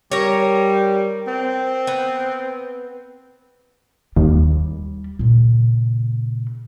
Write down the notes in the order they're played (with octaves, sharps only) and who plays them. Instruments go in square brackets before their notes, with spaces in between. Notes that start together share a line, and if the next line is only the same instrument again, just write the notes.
[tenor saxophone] G3 [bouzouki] A#4 C#5
[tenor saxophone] C4
[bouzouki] B3
[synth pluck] D#2 [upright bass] G3
[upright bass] A#2 C#3